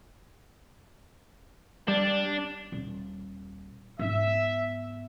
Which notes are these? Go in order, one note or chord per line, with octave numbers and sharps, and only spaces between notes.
G3 D4
D#1
G#2 B3 E5